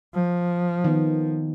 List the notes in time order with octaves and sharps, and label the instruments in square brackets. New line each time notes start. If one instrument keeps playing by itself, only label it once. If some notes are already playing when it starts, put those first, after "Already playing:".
[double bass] F3
[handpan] D#3 B3